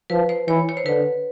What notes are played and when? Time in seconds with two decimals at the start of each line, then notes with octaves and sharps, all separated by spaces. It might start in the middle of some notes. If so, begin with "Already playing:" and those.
0.10 F3 B4
0.29 C5
0.48 E3 C#5
0.69 C#5
0.77 C5
0.85 D3 B4